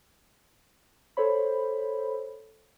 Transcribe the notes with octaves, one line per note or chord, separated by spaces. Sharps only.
A4 C5 C#5 B5